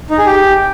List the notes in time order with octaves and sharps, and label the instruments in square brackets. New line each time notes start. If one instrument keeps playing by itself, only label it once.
[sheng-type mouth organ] D#4
G#4
G4